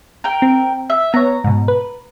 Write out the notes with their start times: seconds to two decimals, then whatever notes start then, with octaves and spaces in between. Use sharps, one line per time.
0.24 A#4 G5
0.42 C4
0.90 E5
1.14 B3 C#5 A#5
1.44 G#2 B2
1.68 B4